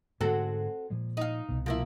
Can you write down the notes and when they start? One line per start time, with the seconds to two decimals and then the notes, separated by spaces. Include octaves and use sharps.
0.21 G#2 D3 G#3 C4 F#4 A4
0.90 A#2 F3 G#3
1.17 D#4 F5
1.49 C2 B2
1.66 F3 A#3 E4